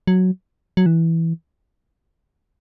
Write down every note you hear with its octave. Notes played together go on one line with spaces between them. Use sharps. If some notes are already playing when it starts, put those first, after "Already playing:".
F#3
F#3
E3